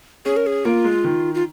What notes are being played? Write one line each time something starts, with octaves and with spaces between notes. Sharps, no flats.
C#4 G#4
A#4
G#4
A#3 F4
G#3
D#3
F4